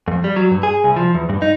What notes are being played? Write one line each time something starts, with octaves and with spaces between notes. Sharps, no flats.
F2
G3
F#3
G2
G#4
C2
F3
E2
G2
D#4